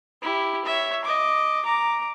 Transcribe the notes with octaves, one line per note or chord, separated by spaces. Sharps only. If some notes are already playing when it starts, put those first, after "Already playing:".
E4 G4
C#5 E5
D#5 D6
A#5 D6